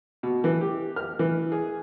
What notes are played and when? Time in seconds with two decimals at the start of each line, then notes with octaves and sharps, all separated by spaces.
0.23 B2
0.44 E3
0.61 G4
0.96 F6
1.19 E3
1.52 G#4